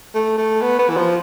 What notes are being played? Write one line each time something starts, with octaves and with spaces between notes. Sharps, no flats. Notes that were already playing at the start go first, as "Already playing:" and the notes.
A3
A3
B3
B3
E3
F3